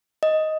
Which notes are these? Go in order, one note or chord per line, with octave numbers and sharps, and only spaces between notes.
D#5